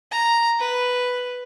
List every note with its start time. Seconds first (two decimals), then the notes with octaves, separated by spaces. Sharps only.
0.11 A#5
0.59 B4